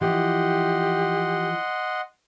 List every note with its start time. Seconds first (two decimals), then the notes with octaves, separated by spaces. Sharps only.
0.01 E3 F3 G4 D#5 F#5 C6